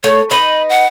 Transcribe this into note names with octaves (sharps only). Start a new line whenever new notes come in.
A3 C#5
D#4 B4 D#5 B5
F#5